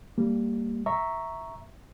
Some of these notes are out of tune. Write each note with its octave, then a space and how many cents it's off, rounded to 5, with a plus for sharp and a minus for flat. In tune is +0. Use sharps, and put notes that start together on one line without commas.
G3 +0 A#3 -20
E5 +0 A#5 +0 C#6 +0